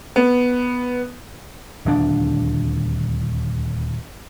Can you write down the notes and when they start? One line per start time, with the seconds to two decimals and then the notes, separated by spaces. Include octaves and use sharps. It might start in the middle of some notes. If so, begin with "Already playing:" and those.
0.16 B3
1.85 D#1 D2 D4